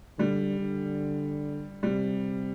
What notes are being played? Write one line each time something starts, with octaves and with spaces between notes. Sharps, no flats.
D3 G3
D3
C3 G3